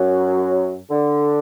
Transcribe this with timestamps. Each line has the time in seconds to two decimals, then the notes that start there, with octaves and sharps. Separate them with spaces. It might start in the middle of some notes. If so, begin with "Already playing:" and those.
Already playing: F#2 F#3
0.90 D3